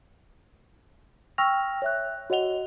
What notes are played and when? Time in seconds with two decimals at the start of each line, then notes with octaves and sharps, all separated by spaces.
1.38 G5 C#6 E6 F6 A#6 F7
1.82 C#5 E5 F#6
2.30 F#4 C#5 D#5 F#5 F7 G7